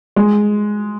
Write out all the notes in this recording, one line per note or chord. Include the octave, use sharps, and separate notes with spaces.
G#3